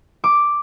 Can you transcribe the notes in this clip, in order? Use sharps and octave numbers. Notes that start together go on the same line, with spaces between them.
D6